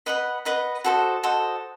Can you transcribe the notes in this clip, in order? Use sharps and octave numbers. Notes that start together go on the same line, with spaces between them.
B4 D#5 F#5 B5
B4 D#5 F#5 B5
F#4 A4 C5 D#5
F#4 A4 C5 D#5